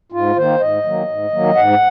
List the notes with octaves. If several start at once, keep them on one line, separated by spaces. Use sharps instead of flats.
G#2 F4
D#3 A#3 C5
G#2 D#5
D#3 F#3 A#3
G#2
D#3 F#3 A#3
G#2 F#5